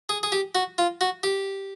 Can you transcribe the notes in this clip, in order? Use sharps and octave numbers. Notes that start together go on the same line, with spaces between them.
G#4
G#4
G4
F#4
F4
F#4
G4